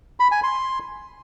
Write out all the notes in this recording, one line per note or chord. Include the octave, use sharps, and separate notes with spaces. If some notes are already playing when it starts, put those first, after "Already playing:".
B5
G#5
C6